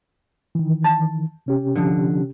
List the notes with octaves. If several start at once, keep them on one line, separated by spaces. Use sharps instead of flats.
D#3 E3
A5
C3 C#4 G4
D3 F3